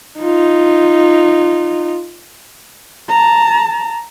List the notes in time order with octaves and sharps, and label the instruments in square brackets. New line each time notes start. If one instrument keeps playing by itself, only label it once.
[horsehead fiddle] D#4 F4
A5 A#5